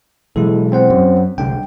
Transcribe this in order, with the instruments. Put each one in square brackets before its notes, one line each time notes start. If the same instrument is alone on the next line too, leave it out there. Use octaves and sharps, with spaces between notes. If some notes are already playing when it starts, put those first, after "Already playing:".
[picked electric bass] B1 E3 G#3 [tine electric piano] E4 A4
[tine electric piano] C4 C5 F#5
[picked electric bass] F#2
[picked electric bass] C2 D3 [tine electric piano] G5